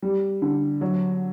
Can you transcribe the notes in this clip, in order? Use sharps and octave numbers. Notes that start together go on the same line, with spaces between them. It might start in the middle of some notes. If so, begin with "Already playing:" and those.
G3
D3
F#3